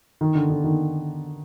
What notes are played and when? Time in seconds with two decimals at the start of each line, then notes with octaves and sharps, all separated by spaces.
0.21 D#3
0.35 D3
0.50 D3
0.64 D#3